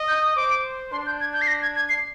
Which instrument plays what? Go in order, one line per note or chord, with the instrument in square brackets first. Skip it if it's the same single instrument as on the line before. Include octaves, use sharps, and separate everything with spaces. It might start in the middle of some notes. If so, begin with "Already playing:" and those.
Already playing: [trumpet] D#5
[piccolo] G6
D#6
[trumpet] C5 [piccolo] D6
[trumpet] D4 [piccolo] C6
[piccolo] G6
G#6
G6
C7
A#6
G#6
G#6
C7